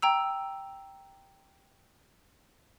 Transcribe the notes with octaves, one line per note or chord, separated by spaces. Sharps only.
G5 A#5 E6